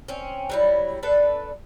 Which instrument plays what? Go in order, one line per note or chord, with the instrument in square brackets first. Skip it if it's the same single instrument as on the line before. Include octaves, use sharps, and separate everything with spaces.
[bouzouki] C4 C#4
F#3 G3 E4
D4 A4 B4